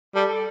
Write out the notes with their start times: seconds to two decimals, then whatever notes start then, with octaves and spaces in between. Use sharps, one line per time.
0.15 G3 A4
0.29 A4